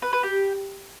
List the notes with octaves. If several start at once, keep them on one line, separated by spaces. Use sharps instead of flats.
B4
B4
G4